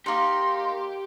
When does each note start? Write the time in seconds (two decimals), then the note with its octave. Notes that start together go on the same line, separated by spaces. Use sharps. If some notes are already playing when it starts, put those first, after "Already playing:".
0.06 A#3 D#4 G4 C6